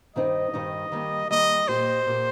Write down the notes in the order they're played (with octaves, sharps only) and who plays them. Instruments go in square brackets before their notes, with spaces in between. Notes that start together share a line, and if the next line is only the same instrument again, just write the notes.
[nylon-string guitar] G2 D#3 C4 D#4 [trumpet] D#5
[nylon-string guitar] G2 D#3 C4 D#4
D#3 G3 A#3
[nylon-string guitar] D#3 G3 A#3 [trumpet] D#5
[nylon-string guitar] A#2 A#3 G4 [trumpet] C5
[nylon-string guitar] A#2 A#3 G4